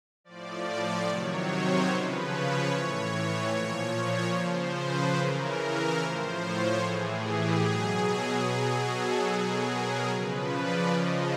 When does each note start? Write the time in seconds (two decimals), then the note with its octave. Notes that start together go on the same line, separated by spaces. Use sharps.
0.24 A2 F3 D5
1.06 C3 D#3 F#3 C#5
1.47 C5
1.88 C#3 F3 B4
2.29 C#5
2.70 A2 E3 C#5
3.52 A#2 F3
3.93 C#5
4.34 C#3 F3 C5
4.75 B4
5.16 C#3 E3 A#4
5.98 A2 F3 C5
6.39 C#5
6.80 A2 E3 G#4
7.21 G4
7.62 B2 F#3 G#4
8.44 B2 F#3
8.85 A4
9.26 B2 F#3 G#4
9.67 A#4
10.08 C#3 F3 B4
10.49 D5
10.90 C#3 F3 D#5